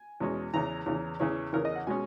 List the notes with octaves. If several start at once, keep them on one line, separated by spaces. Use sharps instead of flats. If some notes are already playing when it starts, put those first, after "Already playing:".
Already playing: G#5
E2 B2 G#3 C#4
E2 C#3 E3 A#5
E2 C#3 E3
E2 C#3 E3 C#5
E2 C#3 E3 A#4
D#5
F#5
B2 G#3 C#4 G#5